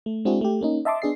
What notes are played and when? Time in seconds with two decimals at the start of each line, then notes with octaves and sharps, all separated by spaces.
0.06 A3
0.25 G#3 C4 D4 E4 F#4 G#4
0.41 A3 G4
0.61 A#3 C#4 D#4
0.85 D#5 E5 A5 C6 D6
1.02 B3 D4 G#4 D#5 C7